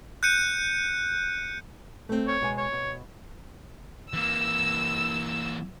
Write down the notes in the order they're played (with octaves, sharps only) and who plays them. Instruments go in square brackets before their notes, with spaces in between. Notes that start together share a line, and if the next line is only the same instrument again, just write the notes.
[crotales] F#6 G6 C#7 D#7
[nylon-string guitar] A3 C4
[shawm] C#5
[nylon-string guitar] B2 G#3 G#5
[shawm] C#5
[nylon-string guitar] B2
[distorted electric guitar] E3 A#3 [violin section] E6